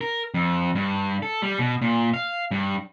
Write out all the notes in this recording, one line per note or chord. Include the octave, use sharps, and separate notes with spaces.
A#4
F2
G2
A4
G3
B2
A#2
F5
G2